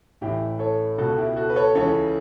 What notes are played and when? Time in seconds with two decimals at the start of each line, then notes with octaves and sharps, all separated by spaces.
0.21 A1 A2 E3 E4 G4
0.59 A4 C#5
0.98 C#2 B2 F#4 A4
1.17 E4 G4
1.36 F#4 A4
1.50 B4
1.56 A4 C#5
1.75 C#2 C#3 E3 A4 C#5